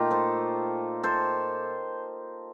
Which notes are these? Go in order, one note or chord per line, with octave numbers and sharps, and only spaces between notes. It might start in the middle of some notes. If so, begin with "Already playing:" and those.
Already playing: A#2 A3 D#4 F4 G4
A4 C5
A4 C5